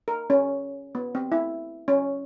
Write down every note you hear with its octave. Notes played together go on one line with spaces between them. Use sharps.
A#4
C#4
B3
C4
E4
C#4